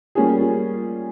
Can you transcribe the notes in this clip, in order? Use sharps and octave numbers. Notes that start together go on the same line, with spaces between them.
G3 A#3 C#4 F4 G#4